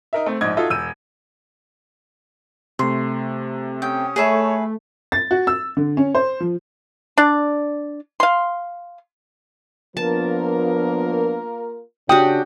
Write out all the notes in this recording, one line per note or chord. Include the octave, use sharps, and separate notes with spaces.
D#4 A#4 E5
A3 C4
A#1 G#2 C5 D#5 G#6
D#4 F4 F#4 A4 D#5 E5
E1 E6 G6 D#7
C3 A3 C6
C#4 G4 G5 D#6
A3 G#4 B4 C#5 E5
A6
F#4
E6
D3
C#4
C5
F3
D4 D5
F5 C6
F3 A#3 B3 D4 F4 A#4 A5
C#3 C#4 D4 F#4 G4 F#5 G5 D#6